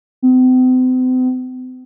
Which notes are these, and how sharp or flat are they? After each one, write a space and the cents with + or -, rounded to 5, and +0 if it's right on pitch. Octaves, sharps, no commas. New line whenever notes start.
C4 -45